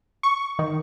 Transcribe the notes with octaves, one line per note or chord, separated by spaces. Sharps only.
C#6
D#3